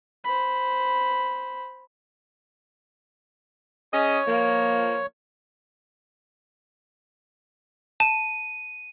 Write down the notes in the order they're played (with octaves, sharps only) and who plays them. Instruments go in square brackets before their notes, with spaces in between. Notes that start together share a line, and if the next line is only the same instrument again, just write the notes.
[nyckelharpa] C5 B5
[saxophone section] C#4 G#4 D#5 [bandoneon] C#5
[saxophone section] F3 A#3
[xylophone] A5 [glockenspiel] D#7